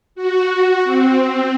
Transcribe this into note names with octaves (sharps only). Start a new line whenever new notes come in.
F#4
C4